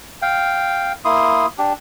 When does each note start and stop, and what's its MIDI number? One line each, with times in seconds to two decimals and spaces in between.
0.22 0.92 77
0.22 0.92 79
1.05 1.46 58
1.05 1.46 64
1.05 1.46 84
1.05 1.46 87
1.58 1.73 62
1.58 1.73 67